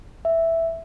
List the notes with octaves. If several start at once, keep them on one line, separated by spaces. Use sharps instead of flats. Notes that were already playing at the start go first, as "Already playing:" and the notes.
E5